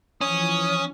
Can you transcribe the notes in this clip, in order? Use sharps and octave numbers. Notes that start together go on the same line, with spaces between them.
E3 F3 C#4 D#6